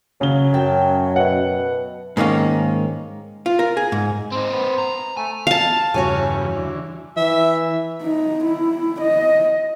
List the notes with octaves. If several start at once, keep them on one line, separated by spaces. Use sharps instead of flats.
C#3 F#3 G7
F#2 G5 A5
B2 E5 F#5
G#2 D#3 A#3 C#4
F4
A#4
G#4
G#2
C4 D#4 C5
C4 B4
A#5
A3 G#5
F5 A5
E2 G2 C#3 F#4 C#5 G#5
D3 E3
E3 E5
D#4
E4
D#5